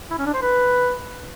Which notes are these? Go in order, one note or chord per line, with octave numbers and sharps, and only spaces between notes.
E4
C#4
D4
C5
B4